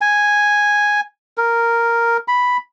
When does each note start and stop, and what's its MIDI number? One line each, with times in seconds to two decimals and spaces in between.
0.01 1.00 80
1.38 2.17 70
2.28 2.57 83